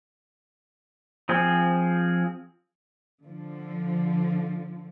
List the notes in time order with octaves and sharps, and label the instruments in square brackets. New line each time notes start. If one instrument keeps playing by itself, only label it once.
[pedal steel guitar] F3 C4 G#4
[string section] D3 F3